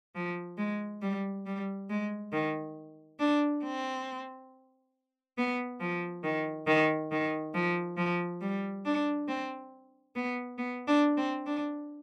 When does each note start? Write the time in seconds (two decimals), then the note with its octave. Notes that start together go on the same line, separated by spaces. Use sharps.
0.15 F3
0.58 G#3
1.02 G3
1.46 G3
1.89 G#3
2.32 D#3
3.19 D4
3.63 C4
5.37 B3
5.80 F3
6.23 D#3
6.67 D#3
7.11 D#3
7.54 F3
7.97 F3
8.41 G3
8.85 D4
9.28 C4
10.15 B3
10.58 B3
10.88 D4
11.17 C4
11.46 D4